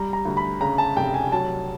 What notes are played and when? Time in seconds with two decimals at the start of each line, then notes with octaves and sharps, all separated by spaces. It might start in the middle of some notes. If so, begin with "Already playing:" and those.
Already playing: G3 A#5
0.13 A#5
0.25 D2
0.37 B5
0.61 C#3 A#5
0.78 A5
0.97 F1 G5
1.14 G#5
1.32 F#3 A5